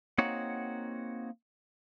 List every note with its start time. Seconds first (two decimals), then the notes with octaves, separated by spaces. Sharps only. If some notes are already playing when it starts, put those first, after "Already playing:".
0.18 A#3 C4 D#4 F#4 C#5 F#5